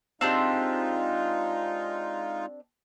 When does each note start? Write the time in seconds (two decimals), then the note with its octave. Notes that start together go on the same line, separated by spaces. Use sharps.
0.21 G#3 C4 D4 D#4 F4 G4